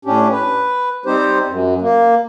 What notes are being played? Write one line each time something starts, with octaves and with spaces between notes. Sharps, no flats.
A2 C#4 D4 G4
B4
G3 C4 D#4 G4 C5
F#2
A#3